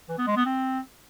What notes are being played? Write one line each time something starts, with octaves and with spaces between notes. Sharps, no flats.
E3
B3
G#3
B3
C4